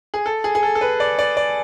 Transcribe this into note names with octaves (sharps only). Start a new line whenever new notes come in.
G#4
A4
G#4
G#4
A4
A4
B4
D5
D5
D5